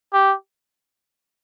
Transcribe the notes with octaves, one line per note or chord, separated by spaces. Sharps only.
G4